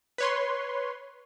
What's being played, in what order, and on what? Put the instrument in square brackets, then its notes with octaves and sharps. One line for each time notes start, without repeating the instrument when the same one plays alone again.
[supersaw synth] B4 C#5 C6